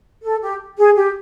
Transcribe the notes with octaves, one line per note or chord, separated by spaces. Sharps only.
A4
G4
G#4
G4